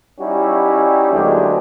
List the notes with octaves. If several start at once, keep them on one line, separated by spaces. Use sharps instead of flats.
G3 C#4 D#4 E4 F#4 G4
D2 F#3 G#3 A#3 D4 G4